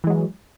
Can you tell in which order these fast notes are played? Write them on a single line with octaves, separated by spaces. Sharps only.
E3 G#3 F#3